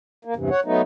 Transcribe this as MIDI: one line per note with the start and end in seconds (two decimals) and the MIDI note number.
0.25 0.34 58
0.36 0.50 40
0.36 0.50 43
0.36 0.50 48
0.36 0.50 52
0.50 0.60 73
0.50 0.60 78
0.65 0.82 54
0.65 0.82 57
0.65 0.82 59
0.65 0.82 63